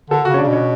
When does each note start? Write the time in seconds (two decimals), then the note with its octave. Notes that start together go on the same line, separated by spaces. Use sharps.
0.10 D3 A4
0.25 C#3 F#4
0.34 C#4
0.38 C#3 D4
0.48 B2 C#4